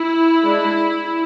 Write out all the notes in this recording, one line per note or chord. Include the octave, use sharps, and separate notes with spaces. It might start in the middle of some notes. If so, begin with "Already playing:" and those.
Already playing: E4
G#3 D4